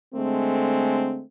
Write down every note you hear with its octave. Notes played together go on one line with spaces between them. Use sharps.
D3 G#3 A3 C4